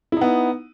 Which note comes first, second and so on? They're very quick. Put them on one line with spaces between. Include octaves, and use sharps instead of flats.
E4 D#4 B3